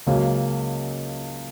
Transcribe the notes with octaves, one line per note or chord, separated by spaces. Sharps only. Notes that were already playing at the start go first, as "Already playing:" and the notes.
C#2 C#3 F#3 A#3